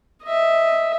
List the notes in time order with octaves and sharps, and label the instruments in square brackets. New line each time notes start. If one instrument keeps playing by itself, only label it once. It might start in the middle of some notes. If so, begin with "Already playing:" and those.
[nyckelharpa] D#5 E5